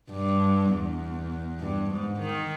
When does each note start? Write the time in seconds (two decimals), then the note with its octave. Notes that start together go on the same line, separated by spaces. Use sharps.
0.11 G2
0.71 E2
1.60 G2
1.90 G#2
2.20 D#3